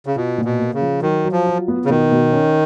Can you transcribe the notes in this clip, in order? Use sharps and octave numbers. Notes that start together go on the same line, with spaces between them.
C#3
B2 F4
A#2
B2
A#3
C#3
F3
D#3 F#3
F#3
F3
F4
B3
C#3
B2 D#3
B2
C#4